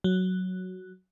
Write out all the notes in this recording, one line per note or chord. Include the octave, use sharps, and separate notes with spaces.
F#3